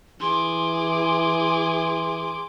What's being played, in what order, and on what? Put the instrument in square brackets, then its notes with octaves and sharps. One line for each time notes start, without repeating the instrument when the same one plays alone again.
[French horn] E3 [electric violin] G#4 D6 [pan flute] C6